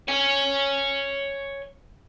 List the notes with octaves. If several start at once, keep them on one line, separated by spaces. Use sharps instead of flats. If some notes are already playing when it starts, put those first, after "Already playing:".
C#5 G#5